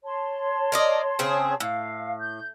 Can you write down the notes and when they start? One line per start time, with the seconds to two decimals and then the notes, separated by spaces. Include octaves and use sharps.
0.04 C#5 A5 C6
0.72 A#4 D5 D#5
1.19 C#3 C4 G#4
1.60 A2 F5
2.20 G6